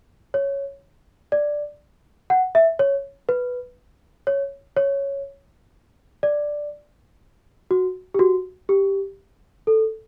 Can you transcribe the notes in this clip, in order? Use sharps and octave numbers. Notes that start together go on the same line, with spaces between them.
C#5
D5
F#5
E5
C#5
B4
C#5
C#5
D5
F#4
G4
F#4
G4
A4